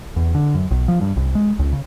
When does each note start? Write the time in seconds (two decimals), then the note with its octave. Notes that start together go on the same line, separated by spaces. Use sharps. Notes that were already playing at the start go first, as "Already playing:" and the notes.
0.16 E2
0.35 D3
0.55 F#2
0.71 B1
0.88 F3
1.01 G2
1.17 C2
1.35 G#3
1.59 C#2
1.73 C#3